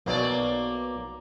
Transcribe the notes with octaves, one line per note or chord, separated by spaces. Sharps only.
B1 B2 F#3 A#3 D5